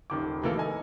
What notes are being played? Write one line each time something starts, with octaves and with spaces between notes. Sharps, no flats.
D#1 D#3 D6
B2 E3 A#3 A4
D#5 G#5